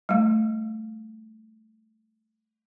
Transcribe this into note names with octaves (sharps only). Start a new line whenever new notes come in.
G3 A3